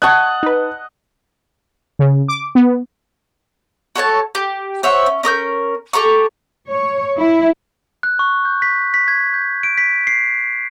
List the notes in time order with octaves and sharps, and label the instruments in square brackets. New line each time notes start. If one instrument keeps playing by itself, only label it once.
[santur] D#5 F#5 [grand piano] A5 F#6 [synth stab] C#6 G#6
[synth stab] D#4 B4
C#3
D6
B3
[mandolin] F#4 A4 C#5 A5
G4
C5 C#5 E5 F#5
C#4
C#4 A#4 D#6 G6
G4 A4 A#5 C#6
[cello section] C#5
E4
[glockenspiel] F#6
C#6
G6
B6
B6
G#6
G6
D7
B6
C7